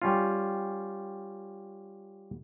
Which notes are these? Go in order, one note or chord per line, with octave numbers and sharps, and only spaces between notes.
G3 C#4 F4